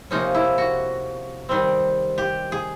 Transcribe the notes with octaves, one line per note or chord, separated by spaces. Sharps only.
C3 F3 A#3 C#4 D#4
E4
F#4
D#3 G3 C4
G4
G#4